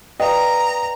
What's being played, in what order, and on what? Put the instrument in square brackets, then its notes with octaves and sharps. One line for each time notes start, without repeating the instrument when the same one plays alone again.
[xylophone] B4 D5 F5 [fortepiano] D#5 [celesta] G5 [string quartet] A#5